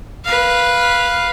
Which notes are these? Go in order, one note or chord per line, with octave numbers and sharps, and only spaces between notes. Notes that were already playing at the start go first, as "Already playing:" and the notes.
B4 F5